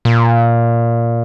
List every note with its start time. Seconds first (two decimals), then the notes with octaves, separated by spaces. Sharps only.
0.05 A#2